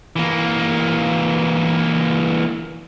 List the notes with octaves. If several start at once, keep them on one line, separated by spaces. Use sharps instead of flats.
E3 A#3